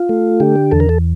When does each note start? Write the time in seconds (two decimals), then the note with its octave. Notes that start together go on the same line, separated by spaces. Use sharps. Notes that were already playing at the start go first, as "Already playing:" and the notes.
Already playing: F4
0.09 A3
0.40 D3 G4
0.71 E2 A4
0.80 A#4
0.89 A4